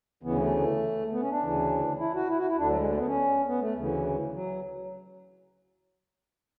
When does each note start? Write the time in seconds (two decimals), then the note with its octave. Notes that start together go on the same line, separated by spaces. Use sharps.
0.23 D2 C#3 E3 B3
0.38 A3
1.12 B3
1.21 C#4
1.31 D4
1.41 D2 C#3 E3
1.99 E4
2.15 F#4
2.29 E4
2.38 F#4
2.48 E4
2.57 D2 D3 D4
2.68 F#3
2.77 G#3
2.87 A3
2.97 B3
3.06 C#4
3.47 B3
3.60 A3
3.76 D2 C#3 E3
4.34 F#3